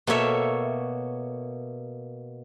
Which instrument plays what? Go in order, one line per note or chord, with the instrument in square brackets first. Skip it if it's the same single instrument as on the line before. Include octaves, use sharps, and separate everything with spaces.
[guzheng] B2 A#3 A4 C#5 E5